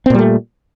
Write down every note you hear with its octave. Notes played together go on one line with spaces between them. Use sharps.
A#2 G3 A3 C4